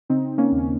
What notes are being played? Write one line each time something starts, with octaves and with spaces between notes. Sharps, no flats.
C#3 C4 D#4
A#3 C#4
D#2
C#4